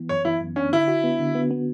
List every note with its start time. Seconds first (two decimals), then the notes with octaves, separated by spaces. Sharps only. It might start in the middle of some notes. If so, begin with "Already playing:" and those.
Already playing: E3 B3
0.09 F#2 C#5
0.25 E3 E4
0.41 F#2
0.56 C#4 D4
0.72 D3 E4
0.88 F#4
1.04 B3
1.19 D3
1.35 B3
1.51 B3